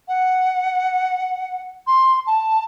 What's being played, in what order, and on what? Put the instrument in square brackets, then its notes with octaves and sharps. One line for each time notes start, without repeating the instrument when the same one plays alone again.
[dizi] F#5
C6
A5